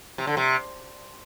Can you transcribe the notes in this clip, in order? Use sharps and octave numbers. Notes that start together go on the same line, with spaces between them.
C3
D3
C3